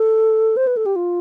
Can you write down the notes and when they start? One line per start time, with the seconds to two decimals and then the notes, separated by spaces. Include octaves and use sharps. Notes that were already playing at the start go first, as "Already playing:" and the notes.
Already playing: A4
0.57 C5
0.67 B4
0.77 A4
0.86 G4
0.96 F4